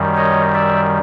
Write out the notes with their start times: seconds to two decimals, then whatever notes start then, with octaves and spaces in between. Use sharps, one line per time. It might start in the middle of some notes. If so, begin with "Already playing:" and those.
Already playing: F#2 D#3 G3
0.16 C#5 D#5
0.54 D5 E5